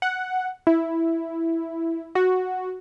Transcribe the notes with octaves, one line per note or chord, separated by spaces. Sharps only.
F#5
E4
F#4